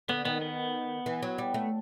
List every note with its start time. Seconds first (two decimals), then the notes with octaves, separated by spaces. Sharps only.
0.09 D3 B3
0.25 D#3 B3
0.42 B3
1.06 E3
1.22 F#3
1.38 G3
1.54 A3